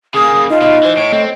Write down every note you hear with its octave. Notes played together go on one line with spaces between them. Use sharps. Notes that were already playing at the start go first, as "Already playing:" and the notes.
C#3 A#3 G#4 D#6
D#4 F4 D#5
B2 D#5
E3 C5
A2 C#5 D7
A3 C4